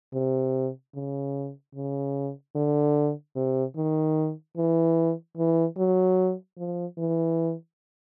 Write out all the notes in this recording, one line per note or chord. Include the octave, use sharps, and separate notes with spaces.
C3
C#3
C#3
D3
C3
D#3
E3
E3
F#3
F3
E3